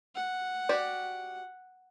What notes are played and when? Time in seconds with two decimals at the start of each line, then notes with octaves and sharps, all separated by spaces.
0.15 F#5
0.69 F#4 G4 D5